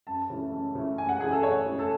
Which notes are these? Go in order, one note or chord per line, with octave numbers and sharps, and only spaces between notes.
F#2 A5
C#3 E3 A3
F#2
C#3 E3 A3
F#2 G#5
F#5
C#3 E3 A3 G#4
A4
F#2 C#5
C#3 E3 A3
A4